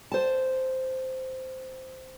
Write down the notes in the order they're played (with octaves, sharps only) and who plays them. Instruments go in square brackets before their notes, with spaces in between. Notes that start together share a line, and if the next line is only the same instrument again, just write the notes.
[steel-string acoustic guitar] C5 A5